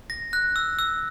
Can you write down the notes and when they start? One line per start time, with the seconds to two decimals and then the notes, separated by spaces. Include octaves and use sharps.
0.10 A#6
0.33 F#6
0.56 E6
0.79 E6